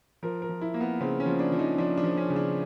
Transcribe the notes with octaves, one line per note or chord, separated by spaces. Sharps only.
F3 A#4
A#4
F3
E4
A#3
B3
C#3 C4
C#4
F3
D4
F3
D#4
F3 D4
D4
F3
C#4
C#3
D4